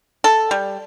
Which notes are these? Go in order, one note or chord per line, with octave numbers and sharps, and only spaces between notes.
A4
G3